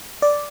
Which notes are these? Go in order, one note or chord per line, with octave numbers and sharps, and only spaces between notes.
D5